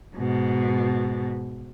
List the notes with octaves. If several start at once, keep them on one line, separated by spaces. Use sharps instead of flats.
G#2 B2